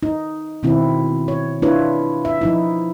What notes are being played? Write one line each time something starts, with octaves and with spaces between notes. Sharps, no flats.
D#4
B2 D#3 C4 E4
C#5
D4 E4 F4 B4 C#5
E5
F3 D#4 E4